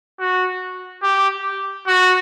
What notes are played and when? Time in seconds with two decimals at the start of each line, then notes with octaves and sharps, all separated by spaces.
0.20 F#4
1.03 G4
1.87 F#4